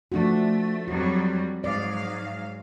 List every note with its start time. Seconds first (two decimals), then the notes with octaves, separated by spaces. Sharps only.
0.12 F3 A3 D4 F#4
0.88 F2 F#3 G3 F#4
1.64 G#2 F#3 D5 F5